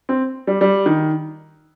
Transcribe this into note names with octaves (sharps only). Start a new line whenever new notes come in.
C4
G3
G3
D#3